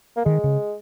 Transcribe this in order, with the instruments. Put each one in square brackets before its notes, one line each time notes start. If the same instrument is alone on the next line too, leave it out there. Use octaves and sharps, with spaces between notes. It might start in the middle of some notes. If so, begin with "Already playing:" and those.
[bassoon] A#3
[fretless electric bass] D#3 [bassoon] G#3
[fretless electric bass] C#3